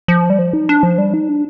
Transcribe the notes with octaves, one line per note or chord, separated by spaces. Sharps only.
F3
G3
F3
D#4
D4
F3
G3
D#4
D4